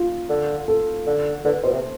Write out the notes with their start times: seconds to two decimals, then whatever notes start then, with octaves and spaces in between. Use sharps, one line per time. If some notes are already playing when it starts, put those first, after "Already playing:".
Already playing: F4
0.30 D3
0.68 A4
1.07 D3
1.45 D3 B4
1.63 B2 C5
1.73 C3